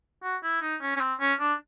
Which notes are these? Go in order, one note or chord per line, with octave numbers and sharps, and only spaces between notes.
F#4
E4
D#4
C#4
C#4
C4
C#4
D4